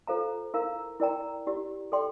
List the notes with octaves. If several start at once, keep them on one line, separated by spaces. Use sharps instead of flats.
F4 A4 C5 F5 A#5
E4 A#4 F5 A#5
E4 A#4 D5 G5 A#5
E4 G4 D5
A4 D5 G5 C6